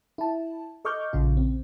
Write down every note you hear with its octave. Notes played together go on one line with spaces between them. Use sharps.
E4 A5
A4 D#5 C#6 D6 F6 G6
A#1 C#3 F4
C4